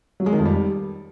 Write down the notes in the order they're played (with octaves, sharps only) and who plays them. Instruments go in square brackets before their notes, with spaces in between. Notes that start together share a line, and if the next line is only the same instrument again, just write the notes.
[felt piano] F#3
G#3
D#3
F2
G3